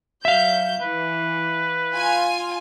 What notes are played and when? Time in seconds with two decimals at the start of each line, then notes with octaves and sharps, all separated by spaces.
0.25 F#3 E5 F5 G6
0.81 E3 B4
1.95 F4 G#5